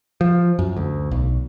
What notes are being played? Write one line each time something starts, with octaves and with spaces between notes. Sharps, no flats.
F3
F#2
D2
B1